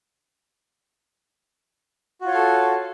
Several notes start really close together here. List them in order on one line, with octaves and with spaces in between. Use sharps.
F#4 F4 C#5 F5 A4